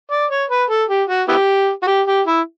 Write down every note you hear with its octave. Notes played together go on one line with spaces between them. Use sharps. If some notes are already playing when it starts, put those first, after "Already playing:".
D5
C#5
B4
A4
G4
F#4
B3 E4 G4
F#4
G4
G4
E4